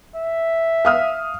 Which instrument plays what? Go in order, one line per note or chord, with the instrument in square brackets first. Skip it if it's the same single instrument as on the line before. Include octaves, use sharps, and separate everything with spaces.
[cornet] E5
[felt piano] F5 D#6 F6